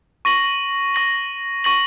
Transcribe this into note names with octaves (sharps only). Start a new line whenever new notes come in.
C#6 A#6 F#7
C#6 A#6 F#7
C#6 A#6 F#7